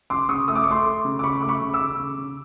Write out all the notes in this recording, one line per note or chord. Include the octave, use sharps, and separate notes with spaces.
C#3 C6 D6
C#3 C#6 D#6
A3 D#6
D6
C#6
A3 C6 D6
A3
C#3
D6
C#3 B5 C#6
A3 D6
B5 C#6
C#3
D6 E6
C#3
C#3
C#3